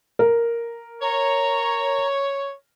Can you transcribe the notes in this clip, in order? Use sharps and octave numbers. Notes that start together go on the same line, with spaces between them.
A#4
C#5 A#5